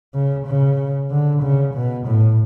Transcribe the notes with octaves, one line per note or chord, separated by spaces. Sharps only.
C#3
C#3
D3
C#3
B2
A2